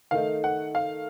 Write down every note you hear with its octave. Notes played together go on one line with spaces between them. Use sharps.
D#3 A3 D#4 F5
F#5
F5